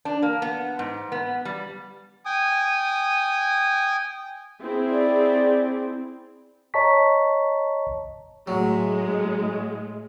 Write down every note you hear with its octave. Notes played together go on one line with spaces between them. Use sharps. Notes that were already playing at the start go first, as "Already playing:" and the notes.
D4
A#3
B3
G#2
B3
G3
G5 G#5 D#6
C4 E4 G#4
D5
C#5 D#5 A5 A#5 C#6 B6
A2 F#3 G#3